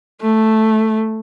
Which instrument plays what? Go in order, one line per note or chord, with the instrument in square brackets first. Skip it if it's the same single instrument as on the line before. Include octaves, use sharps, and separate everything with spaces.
[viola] A3